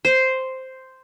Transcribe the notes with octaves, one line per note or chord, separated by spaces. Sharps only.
C5